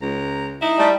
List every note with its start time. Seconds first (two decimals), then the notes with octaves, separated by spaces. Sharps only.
0.02 C#2 A#5
0.62 D#4 E4 D#5
0.78 G3 A3